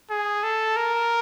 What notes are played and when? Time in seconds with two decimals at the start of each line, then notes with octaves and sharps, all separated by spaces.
0.10 G#4
0.43 A4
0.77 A#4